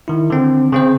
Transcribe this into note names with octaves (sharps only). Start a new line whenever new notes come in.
D#3 E4
D3 C4
C#3 C4 C5